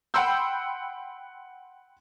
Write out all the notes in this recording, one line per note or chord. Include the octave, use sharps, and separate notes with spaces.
F#5 G5 B5 C6 E6 G6